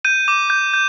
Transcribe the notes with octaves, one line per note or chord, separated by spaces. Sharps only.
G6 D#7
D6
G6
G6